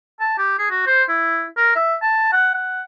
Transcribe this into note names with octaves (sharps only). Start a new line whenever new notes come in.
A5
G4
G#4
F#4
C5
E4
A#4
E5
A5
F#5
F#5